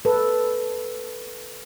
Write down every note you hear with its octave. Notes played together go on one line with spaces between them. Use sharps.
A4 B4